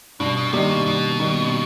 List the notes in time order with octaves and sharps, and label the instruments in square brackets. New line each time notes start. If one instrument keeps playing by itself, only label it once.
[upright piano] G2 [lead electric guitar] B2
[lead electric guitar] B2
[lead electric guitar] C3 [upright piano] D#3 G3 A#3
[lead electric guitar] B2
[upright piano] G2 [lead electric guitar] B2
[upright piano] D#3 G3 A#3